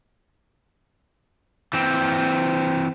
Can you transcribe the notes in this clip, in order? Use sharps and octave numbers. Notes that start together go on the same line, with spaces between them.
E3 C4